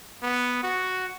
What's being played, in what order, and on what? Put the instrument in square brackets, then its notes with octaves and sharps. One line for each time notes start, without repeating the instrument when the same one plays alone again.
[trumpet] B3
F#4